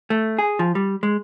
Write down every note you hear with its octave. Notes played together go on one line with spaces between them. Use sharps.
A3
G#4
F3
G3
G#3